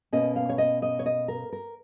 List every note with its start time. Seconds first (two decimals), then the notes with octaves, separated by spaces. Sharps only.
0.13 B2 A#3 C#4 D#5
0.36 F5
0.49 C#5
0.58 D#5
0.82 D#5
0.99 C#5
1.06 D#5
1.28 A#4
1.52 A#4